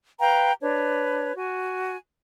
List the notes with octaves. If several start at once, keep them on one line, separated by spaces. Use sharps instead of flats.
B4 F5 G5 A#5
D4 B4 C#5
F#4 G#5